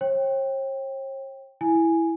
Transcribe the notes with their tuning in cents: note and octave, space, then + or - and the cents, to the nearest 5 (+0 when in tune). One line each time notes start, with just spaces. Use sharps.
C#5 -45 G5 +0
E4 +0 G#5 +0